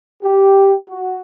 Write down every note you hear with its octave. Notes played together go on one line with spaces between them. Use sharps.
G4
F#4